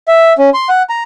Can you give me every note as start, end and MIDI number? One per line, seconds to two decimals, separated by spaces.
0.08 0.33 76
0.38 0.50 61
0.54 0.68 84
0.69 0.83 78
0.89 1.03 82